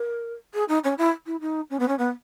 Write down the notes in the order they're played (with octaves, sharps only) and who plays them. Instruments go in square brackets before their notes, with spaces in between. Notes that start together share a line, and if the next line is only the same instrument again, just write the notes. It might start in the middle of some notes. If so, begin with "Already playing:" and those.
Already playing: [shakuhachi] A#4
G#4
D#4
C#4
E4
E4
D#4
C#4
B3
C#4
B3